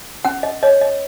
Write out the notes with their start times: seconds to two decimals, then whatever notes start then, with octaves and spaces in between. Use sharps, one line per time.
0.25 C#4 F#5
0.43 D#5
0.63 C#5 D#5
0.81 D#5